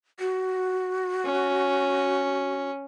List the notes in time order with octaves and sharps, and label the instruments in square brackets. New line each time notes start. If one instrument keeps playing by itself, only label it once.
[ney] F#4
[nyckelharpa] C#4